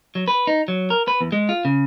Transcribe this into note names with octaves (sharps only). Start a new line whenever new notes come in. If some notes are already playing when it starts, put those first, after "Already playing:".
F#3
B4
D#4
F#3
A#4
B4
E2
G#3
F4
C#3